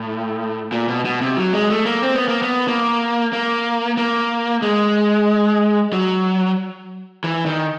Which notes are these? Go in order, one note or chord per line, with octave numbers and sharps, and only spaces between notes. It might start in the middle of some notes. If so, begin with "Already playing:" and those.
Already playing: A2
A#2
B2
B2
C3
F#3
G#3
A3
A#3
C4
B3
A#3
B3
A#3
A#3
A#3
G#3
F#3
E3
D#3